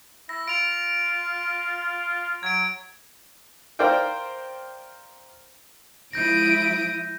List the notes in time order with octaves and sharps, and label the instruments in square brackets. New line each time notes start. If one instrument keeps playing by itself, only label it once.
[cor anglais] E4 [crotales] A#6
[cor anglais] F4 [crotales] D7 F7
[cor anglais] F#3 [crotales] G#6 D7
[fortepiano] A#4 C5 D5 F5 G5
[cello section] F3 G#3 E4 [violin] D#6 D7 [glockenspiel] G6 A#6